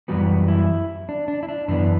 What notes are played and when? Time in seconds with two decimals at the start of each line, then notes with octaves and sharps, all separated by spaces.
0.08 F#2 E3 G3 B3 F#4
0.48 E4
1.09 D4
1.28 D4
1.43 E4
1.49 D4
1.68 F#2 E3 B3 D4